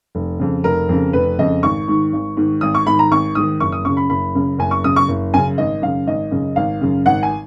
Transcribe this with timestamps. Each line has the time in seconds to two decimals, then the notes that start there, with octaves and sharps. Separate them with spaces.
0.15 F1
0.39 F2 C#3
0.64 F1 A#4
0.89 F2 C#3
1.13 F1 B4
1.38 F2 C#3 D#5
1.63 G#1 C#6
1.88 G#2 D#3
2.13 G#1
2.37 G#2 D#3
2.61 G#1 D#6
2.75 C#6
2.86 G#2 D#3 B5
2.99 A#5
3.11 G#1 C#6
3.35 G#2 D#3 D#6
3.60 F#1 C#6
3.72 D#6
3.85 F#2 C#3 C#6
3.97 B5
4.10 F#1 B5
4.35 F#2 C#3
4.59 F#1 G#5
4.71 C#6
4.84 F#2 C#3 D#6
4.96 C#6
5.08 F#1
5.34 F#2 C#3 G#5
5.58 G#1 D#5
5.82 F#2 C#3 F5
6.07 G#1 D#5
6.31 F#2 C#3
6.56 G#1 F5
6.81 F#2 C#3
7.06 G#1 F#5
7.23 G#5